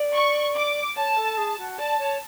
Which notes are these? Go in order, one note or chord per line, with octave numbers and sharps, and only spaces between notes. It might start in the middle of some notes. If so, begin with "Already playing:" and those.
Already playing: D5
C#6
D6
C#5 A5
A4
G#4
F#4
D5 A5
C#5